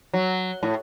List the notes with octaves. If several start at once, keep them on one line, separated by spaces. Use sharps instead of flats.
F#3
A2